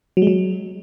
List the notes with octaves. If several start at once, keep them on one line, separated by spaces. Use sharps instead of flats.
F#3
G#3
F#3